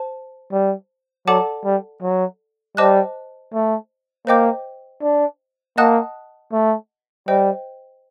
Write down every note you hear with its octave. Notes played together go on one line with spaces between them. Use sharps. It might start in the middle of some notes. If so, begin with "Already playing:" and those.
Already playing: C5 A5
G3
F#3 A4 D5 F#5 A5 D6
G3
F#3
G3 C5 D#5 A5 D6 F#6
A3
A#3 C5 D#5 G5 D6 G6
D4
A#3 D#5 F#5 A5 D#6 F#6
A3
G3 C5 D#5 G5